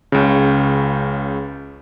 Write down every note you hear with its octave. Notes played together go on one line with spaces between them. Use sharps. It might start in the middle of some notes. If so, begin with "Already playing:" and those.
C#2 C#3